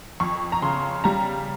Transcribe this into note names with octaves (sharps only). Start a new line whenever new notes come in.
F2 C#6
A#5
C#3 C6
G3 A#5